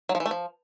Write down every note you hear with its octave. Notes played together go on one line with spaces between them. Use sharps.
F#3
F3
E3
A3
F3